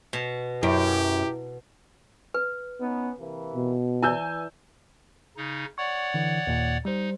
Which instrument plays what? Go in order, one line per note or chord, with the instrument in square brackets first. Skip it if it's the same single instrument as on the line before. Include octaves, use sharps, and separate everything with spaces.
[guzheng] B2
[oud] F#2 [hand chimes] E4 D7 [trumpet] G4
[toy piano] B4
[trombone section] B3 C#4 D#4
C3 E3 A#3
[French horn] B2
[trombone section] E3 [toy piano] E4 D5 [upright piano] G#5 E6 G6
[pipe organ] C#3 D#4
[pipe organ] C#5 D5 F#5 [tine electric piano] C#6
[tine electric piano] D3 E3
D#2 A#2
[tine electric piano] G3 C5 [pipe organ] D#4